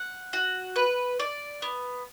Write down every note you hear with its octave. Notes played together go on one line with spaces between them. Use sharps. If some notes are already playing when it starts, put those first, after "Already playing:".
Already playing: F#5
F#4
B4
D5
B3